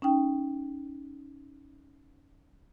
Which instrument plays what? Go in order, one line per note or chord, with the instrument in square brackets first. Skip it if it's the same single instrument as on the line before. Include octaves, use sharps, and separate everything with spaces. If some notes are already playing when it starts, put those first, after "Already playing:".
[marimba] C#4 D#4 G5